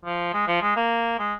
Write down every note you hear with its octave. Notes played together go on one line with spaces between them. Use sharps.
F3
G#3
F3
G#3
A#3
G#3